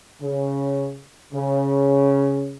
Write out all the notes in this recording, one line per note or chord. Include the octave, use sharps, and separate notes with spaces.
C#3
C#3